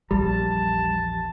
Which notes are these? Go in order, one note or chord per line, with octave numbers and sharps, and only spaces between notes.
A#1 E2 G3 A5